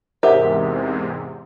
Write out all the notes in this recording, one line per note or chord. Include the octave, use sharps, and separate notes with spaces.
E2 G#2 C3 G4 A#4 C5 E5 F#5